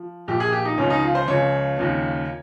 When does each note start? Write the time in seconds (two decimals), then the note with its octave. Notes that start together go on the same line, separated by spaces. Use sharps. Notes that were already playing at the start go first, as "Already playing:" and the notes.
Already playing: F3
0.28 A#1 A#2 F3 G4
0.40 G#4
0.53 G4
0.65 D#4
0.78 C#2 C#3 F3 C#4
0.90 D#4
1.03 F4
1.15 C5
1.28 C#2 C#3 F3 C#5
1.78 D#2 C#3 F3